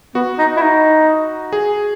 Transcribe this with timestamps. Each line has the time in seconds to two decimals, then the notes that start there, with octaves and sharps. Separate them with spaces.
0.15 B3 F#4
0.38 D#4
0.56 E4
0.61 D#4
1.53 G#4